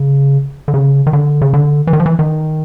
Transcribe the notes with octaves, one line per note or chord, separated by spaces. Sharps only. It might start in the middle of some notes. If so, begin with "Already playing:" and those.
Already playing: C#3
D3
C#3
D#3
D3
C#3
D3
E3
D#3
F3
E3
D#3